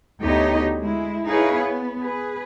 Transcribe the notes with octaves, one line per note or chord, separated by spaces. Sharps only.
D2 B3 D#4 G4 C#5 D#5
G#3 E4
D#4 E4 G#4 B4 C#5 F5
B3
G#4 B4